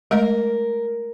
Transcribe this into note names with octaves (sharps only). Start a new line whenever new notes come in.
G#3 A3 A#4 D#5